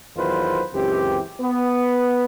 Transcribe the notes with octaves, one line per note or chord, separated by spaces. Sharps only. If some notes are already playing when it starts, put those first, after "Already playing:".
E2 D#3 F#3 F4 B4 C5
C#2 F#2 E3 C4 G4
B3